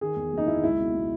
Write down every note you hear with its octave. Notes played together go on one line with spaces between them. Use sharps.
D#3 G#4
E2
F#1
D#4
F#1 E4
C#2 E4
B2
B2